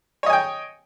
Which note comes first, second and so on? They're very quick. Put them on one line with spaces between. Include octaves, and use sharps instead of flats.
C#5 D#5 G#5 G5